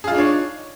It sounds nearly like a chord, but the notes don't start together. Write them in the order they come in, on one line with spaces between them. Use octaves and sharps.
G#4 F4 D#4 D4 C#5